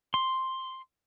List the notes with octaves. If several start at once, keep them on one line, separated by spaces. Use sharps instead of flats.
C6